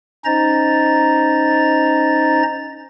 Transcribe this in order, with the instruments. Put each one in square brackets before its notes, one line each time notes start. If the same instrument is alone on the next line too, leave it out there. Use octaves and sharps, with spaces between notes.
[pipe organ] C#4 D#4 C5 D#5 A#5 A6